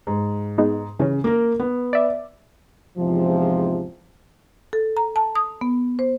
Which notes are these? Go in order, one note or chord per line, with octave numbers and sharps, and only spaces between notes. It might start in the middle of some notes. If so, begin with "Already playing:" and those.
G#2
G#3 B3 D#4
C#3 E3 C#4
A#3 A#4
B3
D5 E5
E2 G#2 C3 F3
A4
A#5
A5
D#6
B3
C5